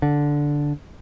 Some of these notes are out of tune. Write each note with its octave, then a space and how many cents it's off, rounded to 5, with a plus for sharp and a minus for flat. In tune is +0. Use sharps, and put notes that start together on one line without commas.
D3 -5